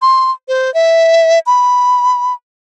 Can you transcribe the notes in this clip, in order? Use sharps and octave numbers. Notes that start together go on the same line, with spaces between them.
C6
C5
E5
B5